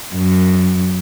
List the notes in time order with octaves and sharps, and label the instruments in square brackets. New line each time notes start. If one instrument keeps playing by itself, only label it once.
[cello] F#2